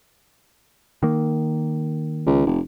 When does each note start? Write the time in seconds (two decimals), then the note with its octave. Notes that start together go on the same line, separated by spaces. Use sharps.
1.03 D#3 A#3
2.26 C#2
2.46 F1